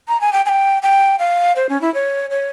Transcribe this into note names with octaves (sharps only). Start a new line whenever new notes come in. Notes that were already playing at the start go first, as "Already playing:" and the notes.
A#5
G#5
G5
G#5
G5
G5
F5
C5
C#4
E4
C#5
C#5